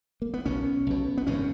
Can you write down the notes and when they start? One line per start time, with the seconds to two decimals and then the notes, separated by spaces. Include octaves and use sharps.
0.22 A#3
0.34 B3
0.45 B1 B2 C#4
0.87 B1 B2
1.17 B3
1.27 G#1 F#2 C#3 C#4